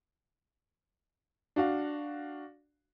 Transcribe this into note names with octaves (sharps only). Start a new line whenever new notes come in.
D4 F#4 F5